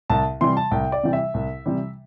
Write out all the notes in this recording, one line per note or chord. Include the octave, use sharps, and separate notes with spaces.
C2 A5
C3 E3 G3 C6
A5
C2 G5
D5
C3 E3 G3 G5
E5
C2
C3 E3 G3